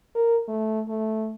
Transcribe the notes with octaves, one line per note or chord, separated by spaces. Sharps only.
A#4
A3
A3